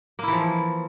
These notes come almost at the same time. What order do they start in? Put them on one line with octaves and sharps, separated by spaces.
A#3 E4 E3 F3